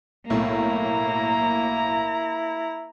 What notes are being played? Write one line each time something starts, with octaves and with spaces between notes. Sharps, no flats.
B1 A2 A#3 E4 A#5